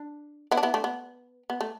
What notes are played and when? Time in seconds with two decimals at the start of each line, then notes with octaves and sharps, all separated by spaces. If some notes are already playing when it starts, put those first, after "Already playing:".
Already playing: D4
0.51 B3 E4
0.57 D4
0.63 B3 E4
0.74 A3 D4
0.84 B3
1.50 B3
1.61 A3